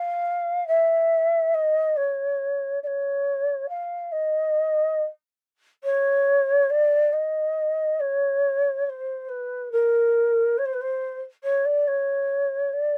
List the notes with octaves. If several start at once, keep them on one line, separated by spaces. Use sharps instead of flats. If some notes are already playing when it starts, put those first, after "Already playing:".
Already playing: F5
E5
D#5
C#5
D5
C#5
F5
D#5
C#5
D5
D#5
C#5
C#5
C5
B4
A#4
C#5
C5
B4
C5
C#5
D5
C#5
D5